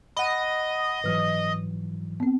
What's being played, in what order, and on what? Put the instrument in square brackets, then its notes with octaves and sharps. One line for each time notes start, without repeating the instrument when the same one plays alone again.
[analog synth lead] D#5 [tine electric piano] F#5 B5
[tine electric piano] G#2 E3 F#3 [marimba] B4 F6
[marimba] B3 C4